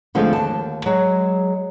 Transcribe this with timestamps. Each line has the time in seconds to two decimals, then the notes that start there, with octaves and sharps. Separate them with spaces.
0.15 D3 F3 G#3 A3 C4
0.33 D#2 A5
0.86 F#3 G#3 G#4